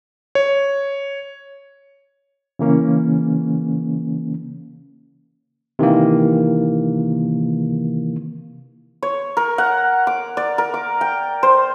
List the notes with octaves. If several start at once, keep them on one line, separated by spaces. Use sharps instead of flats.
C#5
C#3 E3 A#3 C#4
C3 D#3 E3 A#3
C#5
A#4
F#5
D6
D5
A#4
D6
G5
C5